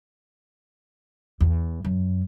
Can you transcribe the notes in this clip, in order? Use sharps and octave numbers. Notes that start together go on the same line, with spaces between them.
E2
F#2